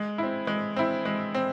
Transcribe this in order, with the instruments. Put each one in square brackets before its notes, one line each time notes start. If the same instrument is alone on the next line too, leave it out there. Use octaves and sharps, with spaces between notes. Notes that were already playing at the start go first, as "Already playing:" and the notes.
Already playing: [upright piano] G#3
C4 E4
G#3
C4 E4
G#3
C4